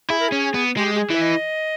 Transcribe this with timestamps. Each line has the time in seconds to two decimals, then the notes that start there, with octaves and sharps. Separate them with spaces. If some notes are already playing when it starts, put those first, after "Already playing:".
0.10 E4 G#4
0.20 A#4
0.28 C#4 G#4
0.54 B3
0.77 G#3 G4
0.94 G4
0.99 G#4
1.10 E3 E5
1.22 D#5